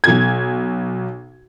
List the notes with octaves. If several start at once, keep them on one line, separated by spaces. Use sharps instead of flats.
B1 G#6